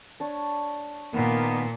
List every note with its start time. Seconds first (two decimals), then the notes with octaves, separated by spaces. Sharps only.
0.20 D4 C#5
1.14 A#2 D#3 A#3 B3